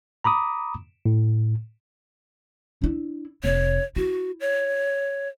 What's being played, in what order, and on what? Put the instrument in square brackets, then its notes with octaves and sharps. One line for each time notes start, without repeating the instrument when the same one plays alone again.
[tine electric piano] A#5 B5 D6 D#6
A2
[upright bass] D4 E4
[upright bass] F1 [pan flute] C#5
[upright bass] E4 [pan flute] F#4
[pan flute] C#5